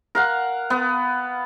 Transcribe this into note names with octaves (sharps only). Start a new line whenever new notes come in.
A#4 F5 F#5
B3